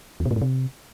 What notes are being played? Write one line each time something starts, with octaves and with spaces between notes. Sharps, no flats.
E2
B2
A2
G#2
C3